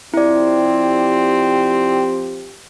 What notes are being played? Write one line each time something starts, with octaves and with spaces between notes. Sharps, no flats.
F3 C4 E4 G4 D5